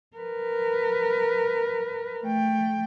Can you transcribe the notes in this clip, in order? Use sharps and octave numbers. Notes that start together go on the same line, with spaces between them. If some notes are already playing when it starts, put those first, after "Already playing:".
A#4 B4
A3 G5